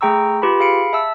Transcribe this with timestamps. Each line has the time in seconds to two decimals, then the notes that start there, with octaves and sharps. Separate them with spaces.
0.01 A3 G#4 G5 A#5 C#6 E6
0.42 F4 G4 B4 B5
0.60 G#4 F5 B5 C#7 D7
0.93 E5 A5 E6